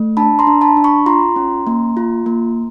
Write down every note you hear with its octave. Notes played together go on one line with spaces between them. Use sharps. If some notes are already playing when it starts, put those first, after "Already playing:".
Already playing: A3
D4 A5 B5
A#5 C6
D4
A5 B5
D4
B5 C#6
F4 A#5 C6
C#4
A#3
F4
A#3